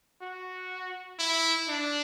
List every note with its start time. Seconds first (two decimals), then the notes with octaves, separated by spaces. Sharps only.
0.21 F#4
1.19 E4
1.69 D4